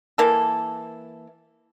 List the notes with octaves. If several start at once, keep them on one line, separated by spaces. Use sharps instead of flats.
E3 A#3 A4